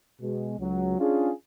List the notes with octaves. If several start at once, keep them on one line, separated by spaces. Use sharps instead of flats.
B2 G#3
C#2 F#3
C#4 D4 F4 G#4